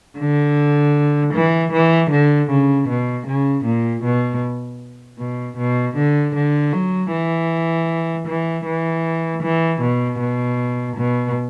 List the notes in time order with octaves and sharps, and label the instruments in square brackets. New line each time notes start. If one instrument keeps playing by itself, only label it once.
[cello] D3
E3
E3
D3
C#3
B2
C#3
A#2
B2
B2
B2
D3
D3
F#3
E3
E3
E3
E3
B2
B2
B2